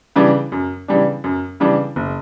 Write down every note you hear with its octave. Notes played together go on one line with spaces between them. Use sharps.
C#3 E3 G3 D4
F#2
C#3 E3 G3 D4
F#2
C#3 E3 G3 D4
F#1